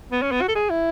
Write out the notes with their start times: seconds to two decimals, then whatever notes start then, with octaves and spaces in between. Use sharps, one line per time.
0.12 B3
0.22 C#4
0.32 B3
0.42 F#4
0.49 A4
0.55 G#4
0.70 E4